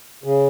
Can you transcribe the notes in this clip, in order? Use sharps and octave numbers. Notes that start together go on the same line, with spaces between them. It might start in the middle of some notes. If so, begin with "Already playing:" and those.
C#3